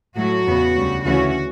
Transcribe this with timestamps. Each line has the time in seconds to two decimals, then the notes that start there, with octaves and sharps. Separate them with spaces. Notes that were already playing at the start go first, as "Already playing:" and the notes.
0.16 A2 F#3 A3 F#4
0.46 E2 C#3 E3 B3
0.75 D2 C#3 G3
1.04 D2 C#3 E3 A3 C#4 F#4